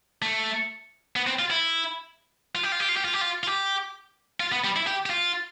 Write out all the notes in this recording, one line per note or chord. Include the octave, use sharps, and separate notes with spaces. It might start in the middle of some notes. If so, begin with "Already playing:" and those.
A3
B3
C4
F4
E4
F4
G4
F4
G4
F4
G4
F4
G4
F4
F4
G4
F4
B3
G3
E4
G4
G4
F4